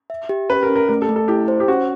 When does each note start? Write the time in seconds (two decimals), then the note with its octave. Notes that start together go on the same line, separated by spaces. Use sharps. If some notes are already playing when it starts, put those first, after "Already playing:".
0.10 E5
0.29 G4
0.49 C#4 B4
0.63 A#4
0.69 C#4
0.76 A#4
0.89 A3 A#4
1.02 A4
1.09 A3
1.16 A4
1.28 E4 G4
1.48 C5
1.60 G4
1.68 C#4 F#4